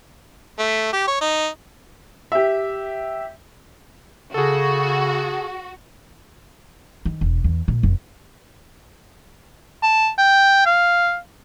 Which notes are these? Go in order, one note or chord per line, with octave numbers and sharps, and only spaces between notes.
A3
G4
C#5
D#4
G4 E5
C#3 F#4 G#4 A4
D#3
E1
E2
A#2
F1
A5
G5
F5